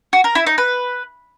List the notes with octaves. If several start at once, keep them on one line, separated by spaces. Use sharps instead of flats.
F#4
A#4
E4
D#4
B4